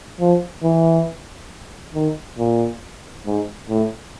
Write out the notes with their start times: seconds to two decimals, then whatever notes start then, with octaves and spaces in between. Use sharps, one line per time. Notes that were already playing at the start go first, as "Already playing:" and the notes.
0.20 F3
0.63 E3
1.95 D#3
2.38 A#2
3.26 G#2
3.69 A2